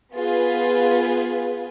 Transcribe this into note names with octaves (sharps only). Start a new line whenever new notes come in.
B3 F4 G#4 B4